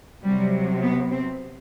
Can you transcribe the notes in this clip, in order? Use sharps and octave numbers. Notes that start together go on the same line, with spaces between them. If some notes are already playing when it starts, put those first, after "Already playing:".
C3 F#3 G3
B3
C4